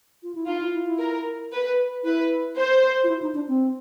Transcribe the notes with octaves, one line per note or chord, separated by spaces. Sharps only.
F4
E4
D#4 F4
E4
E4
E4
A#4
B4
E4 B4
C5
F4
E4
D#4
D4
C4